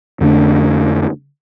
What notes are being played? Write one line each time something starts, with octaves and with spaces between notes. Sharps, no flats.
F2 D3 A3 D4